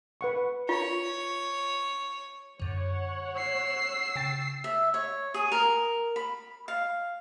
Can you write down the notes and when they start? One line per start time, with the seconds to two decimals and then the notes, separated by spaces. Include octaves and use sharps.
0.21 B4 F#5 C#6
0.69 F4 C#5
2.60 F#2 D3 C#5 F#5
3.37 E6 C7
4.16 C#3 G5 A6
4.64 E5
4.94 C#5
5.34 G#4
5.52 A#4
6.16 B5
6.68 F5